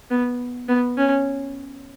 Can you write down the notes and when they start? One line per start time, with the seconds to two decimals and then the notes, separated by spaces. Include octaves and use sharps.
0.11 B3
0.68 B3
0.97 C#4